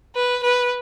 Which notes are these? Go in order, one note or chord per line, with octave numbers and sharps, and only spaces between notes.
B4
B4